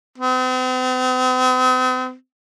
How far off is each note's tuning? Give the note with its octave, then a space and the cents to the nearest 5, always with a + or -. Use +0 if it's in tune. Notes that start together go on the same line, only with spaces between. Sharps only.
C4 -45